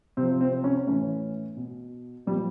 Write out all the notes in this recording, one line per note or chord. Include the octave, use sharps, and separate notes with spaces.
C3 F3 C4
C4
C#4
A2 E3 C#4
B2
A#2 F3 G3